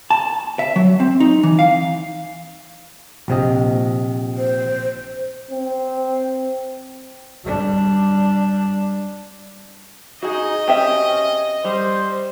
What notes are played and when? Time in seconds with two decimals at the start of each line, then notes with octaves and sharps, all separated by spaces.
0.10 A5
0.59 E5
0.76 F#3
1.00 C4
1.20 D#4
1.43 E3
1.59 F5
3.28 A#1 C3 D#5
4.37 C5
5.51 C4
7.44 G3 D4
10.22 D#4 F#4 G#4 D#5
10.68 C4 C#4 G4 E5
11.64 G3 C5